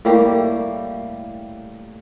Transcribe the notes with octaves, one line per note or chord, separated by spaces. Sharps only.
A2 G3 A#3 G4